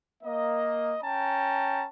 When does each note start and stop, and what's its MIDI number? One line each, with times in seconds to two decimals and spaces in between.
0.24 0.95 58
0.24 0.95 75
1.02 1.85 61
1.02 1.85 79
1.02 1.85 81
1.02 1.85 82